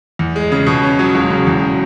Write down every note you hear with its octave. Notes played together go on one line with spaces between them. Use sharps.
E2
G#3
C#3
B2
C#4
F#3
E1
C#3
E2